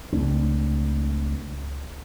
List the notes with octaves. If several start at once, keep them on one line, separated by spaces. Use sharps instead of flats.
C#2 A3 C4 D4